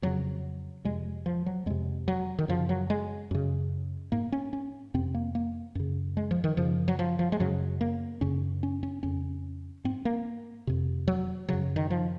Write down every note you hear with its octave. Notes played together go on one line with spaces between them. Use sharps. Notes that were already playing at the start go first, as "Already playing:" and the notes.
F2 C#3 F#3
F2 C3 G#3
F3
F#3
F2 C3 G#3
F#3
D#3
F#2 C#3 F3
F#3
G#3
F#2 C#3
G#2 A#3
C#4
C#4
F2 C3 C4
A#3
A#3
F#2 C#3
G#3
F3
D#3
F#2 C#3 F3
F#3
F3
F3
G#3
F#2 C#3 F#3
A#3
F#2 C#3 C#4
C#4
C#4
F2 C#3 C#4
G#2 C4
A#3
F2 C3
F#3
F#2 C#3 F#3
D#3
F3